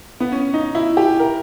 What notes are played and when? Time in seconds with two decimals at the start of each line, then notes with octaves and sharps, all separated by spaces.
0.20 B3
0.32 C#4
0.54 D#4
0.75 E4
0.97 G4
1.20 A#4